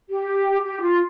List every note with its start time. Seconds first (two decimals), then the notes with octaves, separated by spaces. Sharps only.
0.09 G4
0.63 G4
0.81 F4